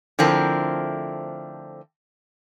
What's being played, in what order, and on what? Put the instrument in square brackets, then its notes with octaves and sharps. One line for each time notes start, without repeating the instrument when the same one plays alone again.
[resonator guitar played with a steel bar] D3 F3 A3 C4 E4 A#4